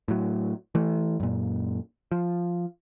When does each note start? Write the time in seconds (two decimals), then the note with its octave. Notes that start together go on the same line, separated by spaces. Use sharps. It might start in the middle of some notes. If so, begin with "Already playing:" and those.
0.08 A2 F#3
0.75 E3 A3
1.20 F#2 A#2
2.12 F3